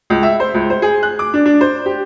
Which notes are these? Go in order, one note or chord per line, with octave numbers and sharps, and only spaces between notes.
C#2
E5
C5
C#2
C5
G#4
F#6
D6
D4
D4
C5
G4